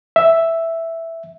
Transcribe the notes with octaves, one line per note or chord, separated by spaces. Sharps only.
E5